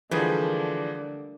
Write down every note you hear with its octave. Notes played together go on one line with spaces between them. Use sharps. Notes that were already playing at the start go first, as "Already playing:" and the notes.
D3 E3 F3 G3 A3 A#3 G#4